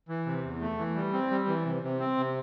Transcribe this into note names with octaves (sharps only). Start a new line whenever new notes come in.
E3
C3
E2
A3
E3
G3
C4
G3
E3
C3
C3
C4
C3